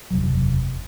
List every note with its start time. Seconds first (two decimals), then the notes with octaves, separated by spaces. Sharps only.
0.11 F#1 E2 C3 F#3